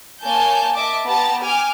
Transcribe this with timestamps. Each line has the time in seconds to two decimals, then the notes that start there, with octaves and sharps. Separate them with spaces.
0.23 A#3 C#5 G#5 A5 G6
0.75 D#5 E5 A5 D6
1.07 B3 G4 A5 A#5 A6
1.42 G5 G#5 D6 F6